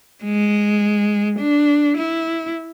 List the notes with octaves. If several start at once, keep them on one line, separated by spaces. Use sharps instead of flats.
G#3
D4
E4